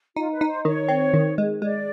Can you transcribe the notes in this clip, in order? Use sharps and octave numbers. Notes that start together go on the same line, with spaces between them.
D#4 F4
B4
D#4
C5
D#3 C#5
C4
D#3
G#3
G#3 D5